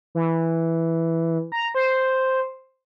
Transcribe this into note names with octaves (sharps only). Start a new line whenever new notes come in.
E3
A#5
C5